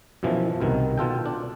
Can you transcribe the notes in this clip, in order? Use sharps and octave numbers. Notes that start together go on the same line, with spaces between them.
F#2 B2 E3 F3
C2 B2 D#3
B2 F4 A4 G5
D4